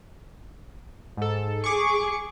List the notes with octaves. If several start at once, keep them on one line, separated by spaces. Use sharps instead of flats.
G#2 A4
G#4 C#6 D6